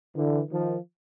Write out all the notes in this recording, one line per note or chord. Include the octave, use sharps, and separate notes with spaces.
D3 E3
D#3 F3